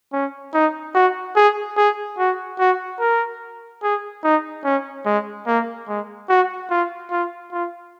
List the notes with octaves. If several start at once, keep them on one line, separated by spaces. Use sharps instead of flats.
C#4
D#4
F#4
G#4
G#4
F#4
F#4
A#4
G#4
D#4
C#4
G#3
A#3
G#3
F#4
F4
F4
F4